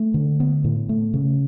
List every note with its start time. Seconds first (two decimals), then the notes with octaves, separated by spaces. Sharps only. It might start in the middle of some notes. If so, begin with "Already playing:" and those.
Already playing: A3
0.14 D3
0.40 B3
0.64 A2
0.89 A3
1.14 C#3